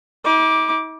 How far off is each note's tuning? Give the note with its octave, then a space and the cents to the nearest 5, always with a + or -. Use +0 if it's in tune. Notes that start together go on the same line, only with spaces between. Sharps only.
D#4 +45 D6 +0